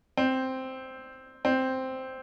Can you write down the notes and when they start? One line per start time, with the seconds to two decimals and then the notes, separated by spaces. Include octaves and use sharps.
0.17 C4
1.45 C4